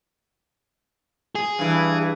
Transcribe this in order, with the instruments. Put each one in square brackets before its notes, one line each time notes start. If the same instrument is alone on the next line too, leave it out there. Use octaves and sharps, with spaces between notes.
[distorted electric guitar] G#4
[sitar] G2 E3